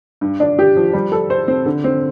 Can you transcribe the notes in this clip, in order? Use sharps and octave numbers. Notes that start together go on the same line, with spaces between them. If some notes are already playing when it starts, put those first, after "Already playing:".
G2
D4
G4
F3
G3
A4
C5
C4
D3
C4